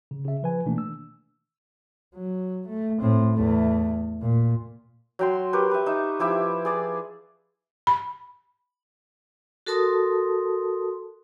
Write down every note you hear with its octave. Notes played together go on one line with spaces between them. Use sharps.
C#3
C#3 E5
F3 B4 G#5
B2 D#3 E3 A3 A#3 D4
E6
F#3
A3
A2 C4
E2 A3
A#2
F#3 G5 C6
G4 A#4 B4 C#5
B4 E5
D#4 E5
F3 E4 G4 E5
G#4 D5
B5
F#4 A4 A#4 A5 C6 D#6